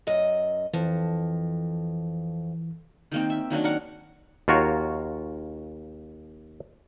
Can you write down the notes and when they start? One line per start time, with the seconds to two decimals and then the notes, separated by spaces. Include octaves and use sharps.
0.07 F#2 D#5
0.73 F2 E3
3.11 D#3 A#3 C4
3.30 E5
3.50 D#3 F#3 A#3 D4
3.64 A#4 F#5
4.48 D#2 F4 F#4 A#4 C#5